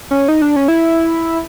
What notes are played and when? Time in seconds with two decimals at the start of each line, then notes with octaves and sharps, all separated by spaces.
0.11 C#4
0.28 D#4
0.42 D4
0.56 C#4
0.68 E4